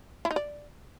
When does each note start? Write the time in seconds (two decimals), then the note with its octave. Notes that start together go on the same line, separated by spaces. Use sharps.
0.25 E4
0.31 D#4
0.36 D5